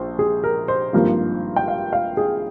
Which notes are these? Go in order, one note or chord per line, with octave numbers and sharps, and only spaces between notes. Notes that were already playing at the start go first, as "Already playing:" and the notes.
Already playing: A#1 C5
G#4
A#4
C5
G#1 G2 F3 A#3
G5
F5
F5
G#4